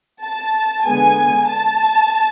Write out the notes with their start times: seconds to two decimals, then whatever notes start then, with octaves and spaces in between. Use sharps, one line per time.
0.24 A5
0.85 D3 G#3 B3 G#5
1.46 A5